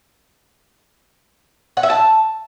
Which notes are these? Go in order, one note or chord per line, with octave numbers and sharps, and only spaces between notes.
F#5
E5
A5